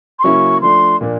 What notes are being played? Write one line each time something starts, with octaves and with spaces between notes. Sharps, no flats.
C6
C#3 F#3 A#3 C#4 E4 C#6
F3 A3 D4 C6
A#2 F3 A#3 D4